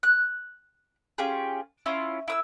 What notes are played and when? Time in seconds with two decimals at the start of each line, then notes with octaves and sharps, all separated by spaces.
0.03 F#6
1.18 C#4 F4 G4 G#4
1.86 C#4 E4 F4
2.28 E4 D#6 E6